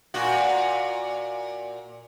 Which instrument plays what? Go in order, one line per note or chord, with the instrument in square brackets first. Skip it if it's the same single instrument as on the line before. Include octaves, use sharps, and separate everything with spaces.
[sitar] A#2 F#4